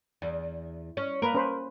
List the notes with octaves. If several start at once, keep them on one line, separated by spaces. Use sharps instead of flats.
E2
C#4
A#3 A#4 B4
C#4 B4 C5